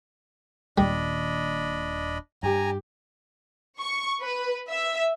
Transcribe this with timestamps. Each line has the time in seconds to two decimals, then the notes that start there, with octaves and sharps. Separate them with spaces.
0.78 D#1 D#2 A#2 G3 D4 D#5 B5
2.43 G2 G4 G#5 A#5
3.80 C#6
4.20 B4
4.70 E5